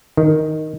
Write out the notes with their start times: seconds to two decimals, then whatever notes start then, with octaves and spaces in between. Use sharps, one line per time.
0.17 D#3